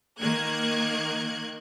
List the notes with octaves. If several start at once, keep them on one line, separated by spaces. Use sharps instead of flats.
D#3 A#3 F#6 G#6